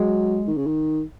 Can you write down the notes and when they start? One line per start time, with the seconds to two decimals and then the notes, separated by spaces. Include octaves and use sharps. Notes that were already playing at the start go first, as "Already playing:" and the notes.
Already playing: F#3 G#3
0.47 D#3
0.57 C#3
0.66 D#3